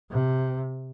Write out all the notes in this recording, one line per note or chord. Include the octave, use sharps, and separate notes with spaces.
C3